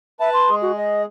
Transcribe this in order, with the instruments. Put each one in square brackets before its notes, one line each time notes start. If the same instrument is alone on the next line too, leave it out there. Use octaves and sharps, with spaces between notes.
[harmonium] B4 A5 [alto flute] E5
[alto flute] C6
[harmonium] G#3 G#4
[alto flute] F#4
D#5